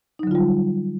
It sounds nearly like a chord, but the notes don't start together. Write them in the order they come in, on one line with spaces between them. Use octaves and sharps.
D#4 F#3 D3 F4 G3